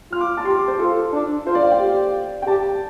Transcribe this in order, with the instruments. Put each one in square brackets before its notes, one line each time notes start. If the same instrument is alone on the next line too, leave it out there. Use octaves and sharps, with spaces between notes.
[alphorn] F4 [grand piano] F6
[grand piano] D6
A5
[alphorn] G4 [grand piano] C6
[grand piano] D6
C5
[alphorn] F4 [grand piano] A4
[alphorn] D4
[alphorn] F4 [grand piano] C5
[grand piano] D5
F5
G5
[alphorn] G4
[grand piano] G5
[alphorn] G4 [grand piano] A5